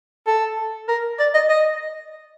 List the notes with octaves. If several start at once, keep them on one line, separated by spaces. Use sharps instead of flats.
A4
A#4
D5
D#5
D#5